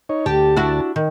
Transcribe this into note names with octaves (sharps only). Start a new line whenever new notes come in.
D#4 C#5
D2 G4 A5
D4 E4 F#4
D#3